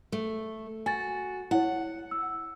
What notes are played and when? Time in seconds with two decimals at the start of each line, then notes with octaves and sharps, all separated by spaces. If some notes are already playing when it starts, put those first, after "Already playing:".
0.12 A3
0.86 F#4 G#5 A6
1.51 E4 C#5 F#5
2.11 E6